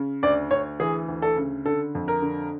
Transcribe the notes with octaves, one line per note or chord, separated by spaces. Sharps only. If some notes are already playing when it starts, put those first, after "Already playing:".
Already playing: C#3
D2 D5
D2 C#5
E3 G#4
D2
A4
C#3
D3 A4
F2
A#4
D3